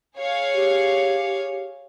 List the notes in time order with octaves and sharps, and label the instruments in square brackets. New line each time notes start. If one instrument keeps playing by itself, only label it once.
[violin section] G#4 C#5 F5
[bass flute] G4